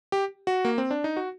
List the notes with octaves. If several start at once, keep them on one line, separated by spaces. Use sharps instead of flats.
G4
F#4
A#3
C4
D4
D#4
F#4